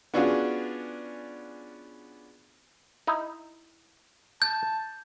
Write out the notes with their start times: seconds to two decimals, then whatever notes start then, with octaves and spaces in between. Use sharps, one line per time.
0.14 B3 C#4 D4 F4 F#4 G#4
3.07 D#4 E4
4.42 A5 G6